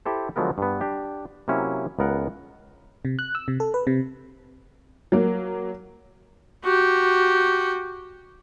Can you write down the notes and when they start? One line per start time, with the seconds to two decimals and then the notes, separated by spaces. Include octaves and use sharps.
0.06 E4 G4 A4 C5
0.36 D3 F3 F#3 G#3 B3 A#4
0.58 G2 B3
0.81 D4 G4
1.48 C3 F#3 A#3 C#4 E4
1.99 C#2 B3 A#4 F#5
3.05 C3
3.19 F#6
3.35 E6
3.48 C3
3.60 A4
3.74 B4
3.87 C3
5.12 F#3 A#3
6.65 F#4 G4